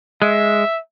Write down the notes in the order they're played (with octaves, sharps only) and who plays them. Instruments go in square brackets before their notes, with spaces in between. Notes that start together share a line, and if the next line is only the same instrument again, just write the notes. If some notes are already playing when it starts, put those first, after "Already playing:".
[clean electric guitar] G#3 [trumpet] E5